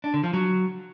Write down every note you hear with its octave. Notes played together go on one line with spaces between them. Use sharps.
D4
D3
F3
F#3